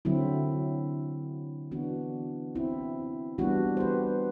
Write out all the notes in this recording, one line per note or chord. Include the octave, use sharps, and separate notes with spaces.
D3 F#3 C4 E4
E3 B3 D4 F#4
C4 E4
E3 G3 B3 D4 F#4
C5
G4 B4